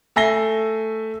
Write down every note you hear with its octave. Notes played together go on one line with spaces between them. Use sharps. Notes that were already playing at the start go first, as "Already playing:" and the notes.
A3 E5 G#5 A#6 C7 G7